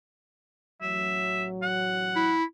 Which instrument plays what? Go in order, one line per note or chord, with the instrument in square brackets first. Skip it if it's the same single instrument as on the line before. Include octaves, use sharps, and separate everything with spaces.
[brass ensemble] A1 F#3 [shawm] E5
[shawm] F#5
[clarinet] E4